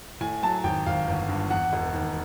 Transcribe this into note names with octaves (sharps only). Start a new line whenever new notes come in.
A2 G#5
F#3 A5
G#1 G5
G#1 F5
G1
G2
E2 F#5
E1
D#2